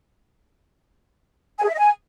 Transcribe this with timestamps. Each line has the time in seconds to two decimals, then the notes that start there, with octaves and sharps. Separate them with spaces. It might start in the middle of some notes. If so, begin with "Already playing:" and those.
1.59 G#5
1.64 G#4
1.69 E5
1.74 D#5
1.79 G#5